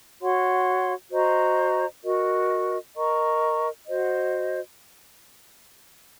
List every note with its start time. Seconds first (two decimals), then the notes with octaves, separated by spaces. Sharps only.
0.20 F#4 C#5 F#5 C6
1.11 F#4 C5 D#5 A#5
2.03 F#4 A#4 D#5
2.95 A#4 D#5 A#5 C#6
3.87 F#4 C5 D#5